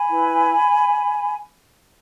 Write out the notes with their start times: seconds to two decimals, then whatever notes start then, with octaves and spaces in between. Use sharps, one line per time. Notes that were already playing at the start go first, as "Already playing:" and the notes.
Already playing: G#5 B5
0.09 E4 B4